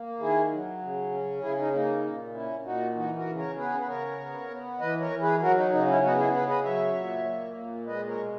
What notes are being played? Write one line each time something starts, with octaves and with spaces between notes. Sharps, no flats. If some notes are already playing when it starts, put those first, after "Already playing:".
Already playing: A#3
D#3 E4 G#4
F#3
C#3
C#4
C#3 E4 G#4
D#4
A#3 D#4
A#2
C#4 E4
A#2 D#4 F#4
E3 D#4 F#4
F#4 A#4
C#3
A#4 C#5
B3 G#4 B4
B4
C#3 A#4 C#5
B3
B3
E3 B4 D#5
A#4 C#5
E3
G#4 B4
F#3 F#4 A#4
D#4
C#3 D#4
C#4 E4
B3 D#4 F#4
E4 G#4
C#3 G#4 B4
B4 D#5
F#3 C#5 E5
A#2
A#3
A#2
G#3 B4 D#5
A#4 C#5
B2